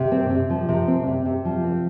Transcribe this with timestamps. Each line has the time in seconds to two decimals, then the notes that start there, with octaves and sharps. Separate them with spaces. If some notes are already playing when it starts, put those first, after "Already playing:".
Already playing: C3
0.12 C4
0.30 C3
0.50 F3
0.69 C3
0.88 C4
1.07 C3
1.25 C3
1.45 F3
1.64 C4